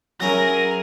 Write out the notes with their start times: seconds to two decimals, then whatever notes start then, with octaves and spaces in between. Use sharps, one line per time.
0.20 F#3 C#4 E4 G#4 A#4 A#6